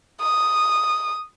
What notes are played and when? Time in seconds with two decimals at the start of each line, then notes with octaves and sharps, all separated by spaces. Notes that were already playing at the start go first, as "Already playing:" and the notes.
0.22 D#6